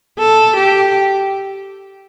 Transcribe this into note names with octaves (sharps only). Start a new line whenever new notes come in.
A4
G4